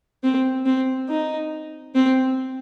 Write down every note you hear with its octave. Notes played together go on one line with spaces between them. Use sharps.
C4
C4
D#4
C4